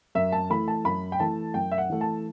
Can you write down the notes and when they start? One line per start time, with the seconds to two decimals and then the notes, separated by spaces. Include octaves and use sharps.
0.15 F#2 E5
0.32 A5
0.50 E3 A3 B5
0.68 A5
0.85 F#2 B5
1.12 G5
1.20 E3 A3 A5
1.54 F#2 G5
1.72 E5
1.78 F#5
1.90 E3 A3
2.01 A5